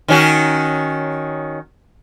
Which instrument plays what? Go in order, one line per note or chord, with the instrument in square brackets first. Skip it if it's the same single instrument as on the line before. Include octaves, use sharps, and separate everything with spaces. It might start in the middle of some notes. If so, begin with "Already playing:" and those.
[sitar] D#3 C#4 F#4